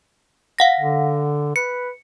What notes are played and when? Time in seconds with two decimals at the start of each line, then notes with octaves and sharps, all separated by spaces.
0.59 F5 F#5 A#6
0.80 D3
1.56 B4 C#7